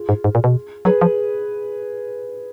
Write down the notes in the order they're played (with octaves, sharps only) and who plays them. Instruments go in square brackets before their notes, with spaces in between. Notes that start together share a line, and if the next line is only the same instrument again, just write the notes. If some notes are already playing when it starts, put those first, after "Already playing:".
Already playing: [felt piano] F4 G#4
[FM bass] G#2
G#2
A#2
B2
[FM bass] F#3 [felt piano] G#4 B4
[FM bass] F3